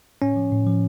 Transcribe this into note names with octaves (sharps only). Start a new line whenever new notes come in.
A2 C#4
F3
A2
F3